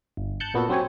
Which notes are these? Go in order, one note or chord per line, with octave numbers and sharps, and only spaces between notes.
G1
A5 F#6 G6 C#7
A#2 B3 F#4 A4
F#3 C4 C#4 G4 C#5 G#5